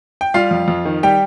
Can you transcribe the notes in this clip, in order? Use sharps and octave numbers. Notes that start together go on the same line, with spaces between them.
G5
G3 F4 F5
F2
F2
D#3
G3 G4 G5